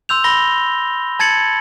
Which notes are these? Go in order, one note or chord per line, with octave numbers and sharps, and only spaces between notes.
C6 E6 G6 F7
B5 A#6 G7
A5 G#6 A6 C#7 F#7